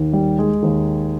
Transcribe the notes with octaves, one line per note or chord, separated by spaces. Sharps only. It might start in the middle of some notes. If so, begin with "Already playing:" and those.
Already playing: D#2 D#3
G3
G#3
D#2 D#3